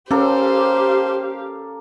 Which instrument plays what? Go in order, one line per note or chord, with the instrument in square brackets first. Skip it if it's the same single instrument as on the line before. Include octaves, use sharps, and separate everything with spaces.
[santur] A#3 A4 [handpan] C#4 [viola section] G4 F5 [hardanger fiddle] C5